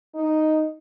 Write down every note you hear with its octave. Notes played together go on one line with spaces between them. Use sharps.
D#4